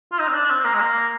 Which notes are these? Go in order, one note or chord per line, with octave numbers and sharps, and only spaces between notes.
F4
D#4
C4
D4
D4
C4
C4
A#3
G#3
A#3